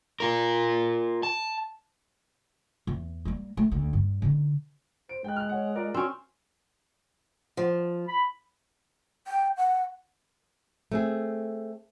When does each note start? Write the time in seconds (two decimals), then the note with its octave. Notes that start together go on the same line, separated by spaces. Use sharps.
0.20 F4 A#4
1.23 A5
2.87 E2
3.25 G3 A#3
3.57 A3
3.72 D2
3.93 G2
4.22 D3 D#4
5.09 C5 D7
5.24 G#3 G5 F#6
5.36 F6 F#6
5.49 C#5 F#5
5.75 F4 A#4 D5
5.94 C4 C#4 F#4
7.57 F3
8.07 B5
9.27 G5
9.57 F#5
10.92 A3 C4 G#4